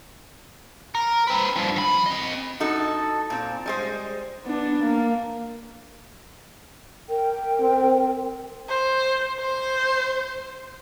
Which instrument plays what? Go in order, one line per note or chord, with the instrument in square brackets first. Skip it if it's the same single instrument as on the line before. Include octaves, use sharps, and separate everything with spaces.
[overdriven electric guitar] A#4
C4 B4
G2 F3
F3 B5
C4 D#5
[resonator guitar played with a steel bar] A2 D#4 F#4 A4
A#2 C4
G3 G#3 C5
[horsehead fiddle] B3 D4
A#3
[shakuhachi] A#4 [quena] G5
[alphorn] C4
[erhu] C5
C5